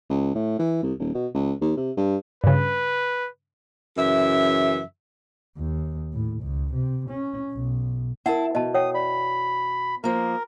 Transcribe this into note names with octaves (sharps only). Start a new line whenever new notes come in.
C#2
A2
E3
C2
D#1
B2
C#2
D#2
C3
G2
G2 C#3 B4
F#2 C#3 E3 E5
D#2
A2
C#2
C3
C#4
B1
E4 A#4 F#5 A5
B2 D#5 A5
C#5 F#5 G5 D#6
D5 B5
F3 A#3 A#4